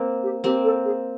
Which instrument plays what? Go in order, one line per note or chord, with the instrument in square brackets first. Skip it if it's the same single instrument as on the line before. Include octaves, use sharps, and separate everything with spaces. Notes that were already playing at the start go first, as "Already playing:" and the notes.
Already playing: [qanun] A#3 C4
[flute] G4
[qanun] A#3 C4 [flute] G4
[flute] A4
G#4